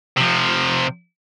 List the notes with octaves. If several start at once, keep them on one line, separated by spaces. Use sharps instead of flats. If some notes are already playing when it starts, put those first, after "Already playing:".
C3 F3